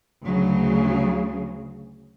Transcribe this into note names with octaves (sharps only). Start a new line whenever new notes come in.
D2 C#3 F#3